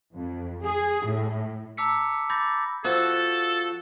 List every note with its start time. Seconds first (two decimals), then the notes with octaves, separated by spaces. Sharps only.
0.15 F2
0.63 G#4
1.07 A2
1.77 A5 A#5 D6 E6 B6 C#7
2.30 B5 D6 G6 A6 A#6
2.84 F3 F#4 A4